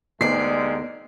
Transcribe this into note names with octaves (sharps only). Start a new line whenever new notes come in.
D2 G#2 C3 G#3 B3 D#4 D5 C7